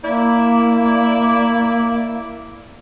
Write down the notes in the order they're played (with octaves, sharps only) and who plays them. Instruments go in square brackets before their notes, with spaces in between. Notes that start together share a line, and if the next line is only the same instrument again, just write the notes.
[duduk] A#3 [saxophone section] E4 D5